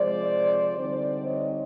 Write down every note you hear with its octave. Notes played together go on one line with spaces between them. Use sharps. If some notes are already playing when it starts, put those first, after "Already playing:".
Already playing: C3 F3 G#3 C5 D5
D3 G3 C4 D#4 C5 D5
C#5 D#5